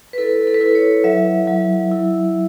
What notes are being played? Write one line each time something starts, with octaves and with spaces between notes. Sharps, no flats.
B4
E4 A4
A4
B4
E4 A4
C#5
F#3 E5
F#3
E4